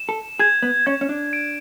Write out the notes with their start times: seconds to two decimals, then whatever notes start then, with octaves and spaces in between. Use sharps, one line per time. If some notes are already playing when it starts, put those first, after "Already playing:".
Already playing: E7
0.09 A4
0.39 G#4 G#6
0.63 B3
0.86 C#4 G#6
1.01 C#4
1.09 D4
1.33 D7